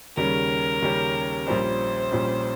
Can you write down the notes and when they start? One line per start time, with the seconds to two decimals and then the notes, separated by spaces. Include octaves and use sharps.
0.16 D#2 C#3 G3 C#4 G4 A#4
0.82 D#2 C#3 G3 C#4 G4
1.47 A#1 A#2 G3 C#4 C5
2.12 A#1 A#2 G3 C#4